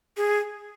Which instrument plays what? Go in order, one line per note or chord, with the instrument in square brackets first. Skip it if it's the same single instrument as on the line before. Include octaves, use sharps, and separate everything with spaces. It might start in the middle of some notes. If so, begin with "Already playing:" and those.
[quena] G#4